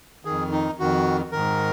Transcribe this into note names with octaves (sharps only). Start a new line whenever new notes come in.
D#3 G#4
F2
D#4
F2 D#3 F#4
G#2 D#3 A#4